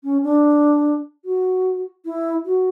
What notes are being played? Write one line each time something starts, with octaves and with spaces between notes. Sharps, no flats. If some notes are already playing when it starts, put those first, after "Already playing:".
C#4
D4
F#4
E4
F#4